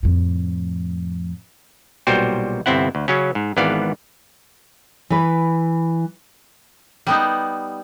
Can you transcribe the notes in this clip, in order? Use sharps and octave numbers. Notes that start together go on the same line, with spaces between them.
F2 A2
B1 A#2 G3 F#4 C5 G5
G1 C3 C4 E4 F#5
D2
C#3 F#3 C#4
G#2
G#1 G#2 E3 B3 D5 F5
E3 B4
G3 B3 D#4